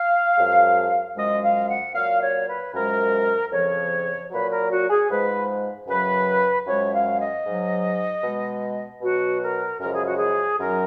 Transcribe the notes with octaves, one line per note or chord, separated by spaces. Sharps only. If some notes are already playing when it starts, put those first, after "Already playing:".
Already playing: F5
F#2 F3 G#3
F#2 F3 G#3 D#5
F5
F#5
A#2 F#3 F5
C#5
B4
F#2 F3 G#3 A#4
F2 C#3 F3 C#5
A#2 F#3 B4
A#4
F#4
G#4
G#2 F3 G#3 B4
F#2 C#3 F#3 B4
F#2 F3 G#3 C#5
F5
D#5
G#2 F#3
B2 G#3
B2 F#3 F#4
A#4
F#2 C#3 F3 G#3 A#4
G#4
F#4
G#4
F#2 D#3 F#3 A#4